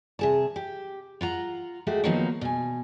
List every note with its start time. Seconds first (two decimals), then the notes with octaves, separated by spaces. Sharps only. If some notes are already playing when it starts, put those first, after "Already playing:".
0.19 C3 G#4 A5
0.56 G4
1.21 F4 F#5 A#5
1.87 G#3 A3 F#4 G4
2.04 D#3 F3 F#3 A#3 B3 D#4
2.41 B2 G#5